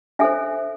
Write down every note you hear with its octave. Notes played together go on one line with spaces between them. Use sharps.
D4 A4 C5 E5 G#5